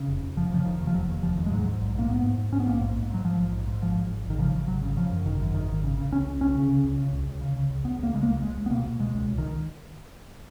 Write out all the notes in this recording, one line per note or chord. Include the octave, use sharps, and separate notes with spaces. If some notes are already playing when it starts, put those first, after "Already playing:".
Already playing: C#3
F1
F1
F1 F3
C#3 F3
F1 D#3
D#2
F3
F1 F#3
D#2
F1 F3
D#2
G#3
G#2 F#3
G#2
A#1
G#2 A#3
G#2 B3
G#2
G#2
G#2 C#4
B3
A#1 A#3
G#2
G#2
G#2 F#3
G#2 F3
A#1
G#2
G#2
G#1 F3
G#1
G#1
G#1
D#3
C#3 F3
G#1
G#1 F#3
C#3
C#3 F3
F#2
G#1 D#3
F#2
G#1 D#3
G#1
C#3
C#3
C#2 C#4
C#2
C#2 C#4
C#3
C#3
C#2
C#3
C#2
C#2
C#3
C#3
C#2
C#2 B3
C#2 A#3
C#3 G#3
A#3
C#2
C#2 G#3
C#2
B3
B2 A#3
B2
B2 G#3
C#2
C#2
D#3